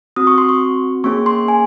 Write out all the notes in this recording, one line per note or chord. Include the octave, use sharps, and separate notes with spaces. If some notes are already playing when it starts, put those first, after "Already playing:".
C4 F#4 D#6
C#6
C6
C#6
A#3 C#4 G#4 C#6
C6
G#5